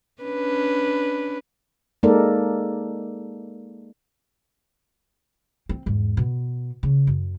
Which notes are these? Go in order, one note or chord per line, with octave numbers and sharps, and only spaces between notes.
C#4 D4 B4
G#3 A#3 D#4 A4 A#4 D5
C4
E2 G#2
B2
C#3
F#2